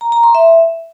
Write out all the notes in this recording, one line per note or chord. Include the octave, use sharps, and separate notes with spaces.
A#5
A#5
C6
E5